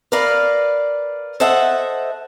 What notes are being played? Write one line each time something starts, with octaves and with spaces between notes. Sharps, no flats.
A#4 B4 D5 F5
A4 C5 D#5 E5 F#5